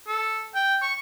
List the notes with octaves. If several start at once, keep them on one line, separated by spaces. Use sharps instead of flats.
A4
G5
C#6